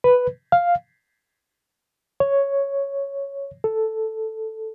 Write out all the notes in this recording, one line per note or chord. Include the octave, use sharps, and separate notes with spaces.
B4
F5
C#5
A4